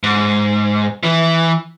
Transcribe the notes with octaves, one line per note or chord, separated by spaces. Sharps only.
G#2
E3